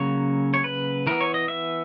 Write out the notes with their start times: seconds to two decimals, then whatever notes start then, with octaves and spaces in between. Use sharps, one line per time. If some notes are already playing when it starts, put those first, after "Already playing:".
Already playing: C#3 F#3 A#3 C#4 C#5
0.54 C#5
0.64 B4
1.07 E3 B3 A#4
1.21 C#5
1.34 D#5
1.48 E5